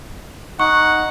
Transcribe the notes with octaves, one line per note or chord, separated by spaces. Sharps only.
D#4 F#5 C#6